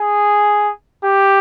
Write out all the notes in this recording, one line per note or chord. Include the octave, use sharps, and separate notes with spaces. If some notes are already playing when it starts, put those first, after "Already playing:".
Already playing: G#4
G4